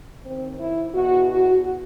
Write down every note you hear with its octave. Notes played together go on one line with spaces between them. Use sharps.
D#2 D#3 C4
E4
E2 B2 F#4
F#4